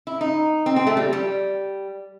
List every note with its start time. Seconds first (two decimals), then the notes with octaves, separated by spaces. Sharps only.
0.07 E4
0.21 D#4
0.66 C4
0.76 C4
0.87 A3
0.97 G3
1.13 G3